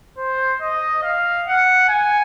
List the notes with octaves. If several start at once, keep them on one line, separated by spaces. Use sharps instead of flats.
C5
D#5
F5
F#5
G#5